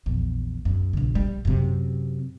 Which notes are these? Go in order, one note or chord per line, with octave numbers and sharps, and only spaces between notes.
A#1 E2
F#2
A#1 C#3
G3
F#2 C3